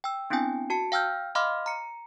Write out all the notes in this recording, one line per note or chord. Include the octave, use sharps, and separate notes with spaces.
G5 E6
B3 C4 D4 E4 G5 G#5
F#4 A5 C#7
F5 G5 E6 F6 G6
D#5 F5 B5 C6 D6 F6
A#5 C#7